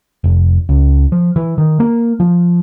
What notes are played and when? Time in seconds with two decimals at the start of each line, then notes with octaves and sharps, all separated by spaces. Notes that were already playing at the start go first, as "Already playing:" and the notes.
0.24 F1
0.69 C#2
1.12 F3
1.36 E3
1.58 D#3
1.80 A#3
2.20 F3